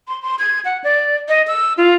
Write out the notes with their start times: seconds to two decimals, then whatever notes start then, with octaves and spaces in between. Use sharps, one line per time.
0.08 C6
0.22 C6
0.39 G#6
0.65 F#5
0.84 D5
1.29 D#5
1.48 E6
1.78 F4